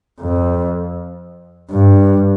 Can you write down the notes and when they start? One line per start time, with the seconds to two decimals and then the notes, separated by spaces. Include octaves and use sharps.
0.21 F2
1.71 G2